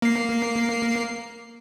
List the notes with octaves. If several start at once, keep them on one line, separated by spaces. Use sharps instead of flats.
A#3 C7